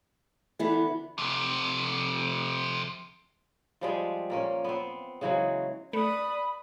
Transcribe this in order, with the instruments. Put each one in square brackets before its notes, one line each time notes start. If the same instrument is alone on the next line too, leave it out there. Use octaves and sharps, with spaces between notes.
[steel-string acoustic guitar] D3 E3 B3 [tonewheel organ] E4
[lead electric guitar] F2 C3
[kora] F3 G3 G#3
A#2 A#3 C#4
B3 C4
C#3 E3 F#3 G#3
[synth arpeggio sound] A3 [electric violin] B4 D#6 [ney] D5 [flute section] B5